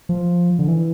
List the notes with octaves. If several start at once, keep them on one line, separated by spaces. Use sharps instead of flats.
F3
D3
E3